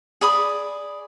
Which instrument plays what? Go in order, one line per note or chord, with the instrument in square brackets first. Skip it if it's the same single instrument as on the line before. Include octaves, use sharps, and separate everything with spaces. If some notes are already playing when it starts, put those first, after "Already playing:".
[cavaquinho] G#4 D5 B5 D#6